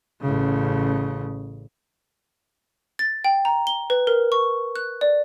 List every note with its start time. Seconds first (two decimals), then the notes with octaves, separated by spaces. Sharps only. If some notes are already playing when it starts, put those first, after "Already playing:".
0.21 A1 C#3
2.99 A6
3.24 G5
3.45 A#5
3.67 G7
3.90 B4
4.07 A#4
4.32 C#6
4.76 F#6
5.01 D5